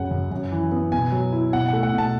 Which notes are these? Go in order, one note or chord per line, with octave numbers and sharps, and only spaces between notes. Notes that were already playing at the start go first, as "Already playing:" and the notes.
Already playing: F#2 C#3 F#5
F#2
F#2
E3
B3
B2 G#5
F#3
E4
B2 F#5
A3 F#5
F#5
B2
A5